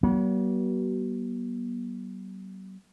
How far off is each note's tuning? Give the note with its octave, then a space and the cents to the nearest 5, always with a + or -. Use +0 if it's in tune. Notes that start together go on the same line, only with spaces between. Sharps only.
F#3 +45 B3 -45